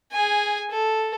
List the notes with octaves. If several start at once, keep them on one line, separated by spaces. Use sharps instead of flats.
G#4 G#5
A4